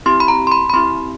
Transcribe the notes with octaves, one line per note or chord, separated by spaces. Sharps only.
C4 E4 G4 C6
B5
A#5
C6
B5
B5
C4 E4 G4 C6